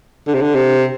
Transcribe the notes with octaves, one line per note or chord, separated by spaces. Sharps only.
D3
C3
D3
C3